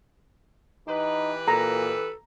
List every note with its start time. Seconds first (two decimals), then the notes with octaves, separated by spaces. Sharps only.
0.87 E3 D#4 G4 B4
1.48 A#2 A4 A#5